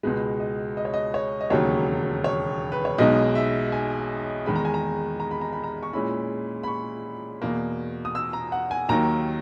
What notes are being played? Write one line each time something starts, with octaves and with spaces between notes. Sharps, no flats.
C#2 B2 G#3 B4
D#5
D#5
C#5
D#5
C#5
D#5
E1 D#2 C#3 F#3 C#5
C#5
B4
C#5
B1 B2 G#3 D#4 D#5
E5
G#5
E2 D#3 G#3 D#4 B5
A#5
G#5
A#5
A#5
B5
A#5
B5
A#5
C#6
A#2 G#3 C#4 E4 B5
B5
C#6
E2 B2 A#3
D#6
E6
A#5
F#5
G#5
D#2 D#3 F#3 A#3 A#5